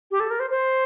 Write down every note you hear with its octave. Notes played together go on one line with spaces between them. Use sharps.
G4
A4
A#4
C5
C5